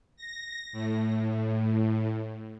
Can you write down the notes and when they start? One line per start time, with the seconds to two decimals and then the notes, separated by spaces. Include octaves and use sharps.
0.17 A#6
0.73 A2